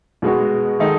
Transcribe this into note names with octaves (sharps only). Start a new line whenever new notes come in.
B2 G#3 B3 F#4
D#3 G#3 D#4 A4